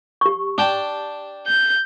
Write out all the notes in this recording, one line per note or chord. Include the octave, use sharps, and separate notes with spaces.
G4 C#6
D4 G5 A5
G6